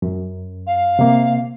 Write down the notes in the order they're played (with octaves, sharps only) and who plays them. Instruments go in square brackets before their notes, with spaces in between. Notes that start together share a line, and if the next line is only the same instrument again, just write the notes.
[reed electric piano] F#2
[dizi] F5
[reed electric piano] C3 A#3